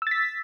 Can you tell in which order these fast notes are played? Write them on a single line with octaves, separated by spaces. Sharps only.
E6 A6 B6